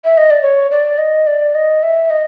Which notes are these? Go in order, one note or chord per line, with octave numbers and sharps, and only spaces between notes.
E5
D#5
D5
C#5
D5
D#5
D5
D#5
E5
D#5